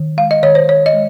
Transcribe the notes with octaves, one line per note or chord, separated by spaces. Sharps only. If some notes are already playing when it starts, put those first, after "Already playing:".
Already playing: D#3
G#3 F5
D#5
D#3 C#5
C5
D#3 C#5
D#5
G#3